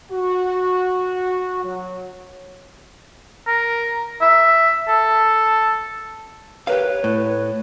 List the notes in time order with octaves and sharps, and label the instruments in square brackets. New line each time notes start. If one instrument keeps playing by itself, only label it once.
[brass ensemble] F#4
F#3
[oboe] A#4
E5
A4
[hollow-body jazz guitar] G4 A#4 F5 [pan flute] B4 [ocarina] C#5
[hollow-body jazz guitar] A2